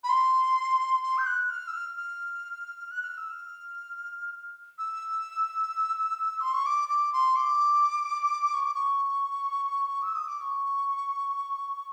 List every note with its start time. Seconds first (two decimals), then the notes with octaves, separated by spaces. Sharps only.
0.04 B5
0.09 C6
1.03 C6
1.18 G6
1.26 F#6
1.50 F6
1.68 E6
1.74 F6
1.97 F6
2.91 F#6
3.03 F6
3.17 E6
3.30 F6
4.78 E6
6.41 C6
6.53 C#6
6.66 D6
6.89 D6
7.13 C6
7.36 D6
8.54 C#6
8.64 D6
8.75 C#6
10.03 E6
10.15 D#6
10.28 D6
10.41 C#6